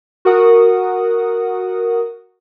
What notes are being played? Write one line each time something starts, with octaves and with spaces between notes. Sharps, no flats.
F#4 A#4 F#5 D#6